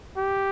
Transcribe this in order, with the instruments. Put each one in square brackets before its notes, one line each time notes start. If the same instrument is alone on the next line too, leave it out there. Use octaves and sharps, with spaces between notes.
[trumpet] G4